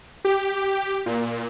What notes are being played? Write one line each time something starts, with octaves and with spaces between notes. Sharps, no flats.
G4
A#2